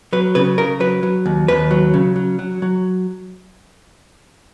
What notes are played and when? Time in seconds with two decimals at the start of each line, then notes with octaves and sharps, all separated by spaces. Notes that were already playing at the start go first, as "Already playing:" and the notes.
0.13 F#3 B4
0.35 C#3 B4
0.58 C#3 A#4
0.80 F#3 B4
1.03 F#3
1.26 D#2
1.48 D#2 B4
1.71 F#3
1.94 C#3
2.16 F#3
2.39 F#3
2.62 F#3